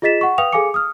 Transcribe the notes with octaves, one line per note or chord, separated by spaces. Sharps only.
F4 G#4 D#5 A6 B6 E7
F#5 C#6
B4 F5 G5 D#6 F7
G#4 A4 F5 G#5 D6 C#7
D#6 F6